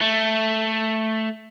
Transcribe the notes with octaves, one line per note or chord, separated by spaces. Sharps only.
A3